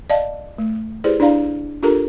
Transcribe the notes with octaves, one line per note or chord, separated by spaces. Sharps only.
D5 D#5 F5 A5
A3
E4 G4 G#4 B4 C5 D5
D4 E4 D5 F5 A#5
D4 F4 G4 A4 A#4 A#5